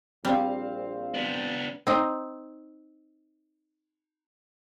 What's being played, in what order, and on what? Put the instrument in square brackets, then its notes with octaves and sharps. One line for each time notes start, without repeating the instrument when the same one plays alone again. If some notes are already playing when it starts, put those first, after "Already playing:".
[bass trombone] A#1 [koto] G3 [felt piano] C4 F5
[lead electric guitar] B3 D4
[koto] C4 D#4